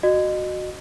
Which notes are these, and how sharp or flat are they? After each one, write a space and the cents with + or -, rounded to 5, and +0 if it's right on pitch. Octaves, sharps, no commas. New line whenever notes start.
F#4 +0 D#5 -25